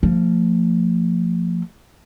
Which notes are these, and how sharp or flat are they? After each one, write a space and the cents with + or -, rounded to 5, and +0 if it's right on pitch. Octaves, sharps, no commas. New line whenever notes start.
F3 +0 A3 +45